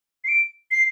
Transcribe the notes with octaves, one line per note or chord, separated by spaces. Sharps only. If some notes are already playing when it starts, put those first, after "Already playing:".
C7
D7
C7